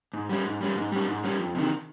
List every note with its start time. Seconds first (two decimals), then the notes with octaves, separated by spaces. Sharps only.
0.14 G#2
0.29 G3 C#4
0.45 G#2
0.61 G3 C#4
0.76 G#2
0.92 G3 C#4
1.07 G#2
1.24 G3 C#4
1.40 F2
1.55 C3 D#3